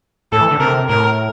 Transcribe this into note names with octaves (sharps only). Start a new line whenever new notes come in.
A2 A4
E3
D3
C3 A#4
A2 A#4